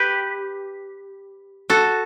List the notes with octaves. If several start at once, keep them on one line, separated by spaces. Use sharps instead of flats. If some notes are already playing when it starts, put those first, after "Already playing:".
Already playing: G4 B4
F#4 A4